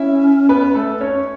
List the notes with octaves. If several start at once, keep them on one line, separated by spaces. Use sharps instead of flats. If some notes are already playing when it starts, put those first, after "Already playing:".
Already playing: C#4 E4 E5
B3 B4
A3 A4
C#4 C#5